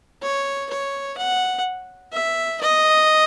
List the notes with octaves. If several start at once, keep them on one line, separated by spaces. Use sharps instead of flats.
C#5
C#5
F#5
E5
D#5